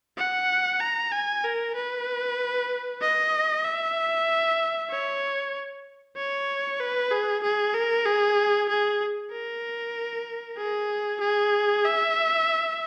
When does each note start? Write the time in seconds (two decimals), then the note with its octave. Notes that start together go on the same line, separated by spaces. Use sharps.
0.18 F#5
0.80 A#5
1.12 G#5
1.44 A#4
1.75 B4
3.01 D#5
3.64 E5
4.91 C#5
6.17 C#5
6.80 B4
7.11 G#4
7.44 G#4
7.75 A#4
8.06 G#4
8.69 G#4
9.32 A#4
10.58 G#4
11.21 G#4
11.85 E5